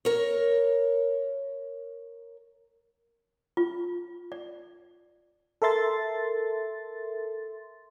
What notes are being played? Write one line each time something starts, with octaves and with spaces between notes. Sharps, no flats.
A#4 C#5
F4
D5
A4 A#4 E5 C6 A6